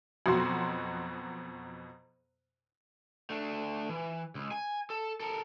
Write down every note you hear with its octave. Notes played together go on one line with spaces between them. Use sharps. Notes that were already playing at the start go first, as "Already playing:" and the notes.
F2 B2 F#3 F#4 C6
A3 D4
E3
C#2
G#5
A4
A4 A#4